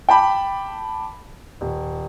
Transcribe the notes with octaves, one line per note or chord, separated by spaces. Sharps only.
G5 A5 B5 D6
D#1